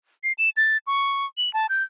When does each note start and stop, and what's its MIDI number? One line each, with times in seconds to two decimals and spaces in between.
0.24 0.33 96
0.38 0.50 100
0.57 0.77 93
0.87 1.26 85
1.38 1.52 102
1.54 1.67 81
1.69 1.83 91